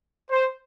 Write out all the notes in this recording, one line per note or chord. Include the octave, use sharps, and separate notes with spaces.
C5